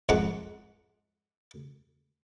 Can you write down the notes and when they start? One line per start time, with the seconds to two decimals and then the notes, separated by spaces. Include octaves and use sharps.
0.09 F2 G#2 F#5 A5 C#6 D6